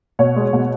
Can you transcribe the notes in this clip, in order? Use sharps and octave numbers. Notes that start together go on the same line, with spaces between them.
B2 C#5
G#3
B2